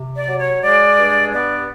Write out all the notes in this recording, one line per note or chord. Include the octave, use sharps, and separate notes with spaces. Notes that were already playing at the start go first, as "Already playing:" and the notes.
Already playing: C3
D5
F#3
C#5
G#3 D5
G2
B3 D5